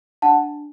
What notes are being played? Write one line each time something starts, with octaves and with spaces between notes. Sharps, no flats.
D4 F#5 A5